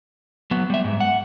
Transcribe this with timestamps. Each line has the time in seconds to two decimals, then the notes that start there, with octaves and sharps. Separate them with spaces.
0.51 F#3 B3
0.70 G3 E5
0.84 G#2
1.00 F#5